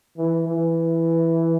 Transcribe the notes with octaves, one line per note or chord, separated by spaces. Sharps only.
E3
E3